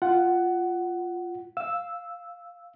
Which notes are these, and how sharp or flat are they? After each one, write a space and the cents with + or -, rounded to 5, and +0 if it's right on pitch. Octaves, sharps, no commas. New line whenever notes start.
F4 +0 F#5 +15
F5 +0 E6 +0